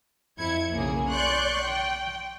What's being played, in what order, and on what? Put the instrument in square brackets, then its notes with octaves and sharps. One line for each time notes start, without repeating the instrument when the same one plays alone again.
[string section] F2 E4 G#6 C#7
B1 C#3 A#3 G#4
D5 C6 C#6 F#6 G6
G5